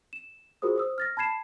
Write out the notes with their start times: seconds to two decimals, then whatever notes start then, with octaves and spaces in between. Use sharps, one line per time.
0.13 E7
0.62 F4 F#4 G#4 A#4 C5 D#6
0.76 C5 D#6 E6
0.98 F6 A6 A#6
1.17 A5 B5 G#6 C7 E7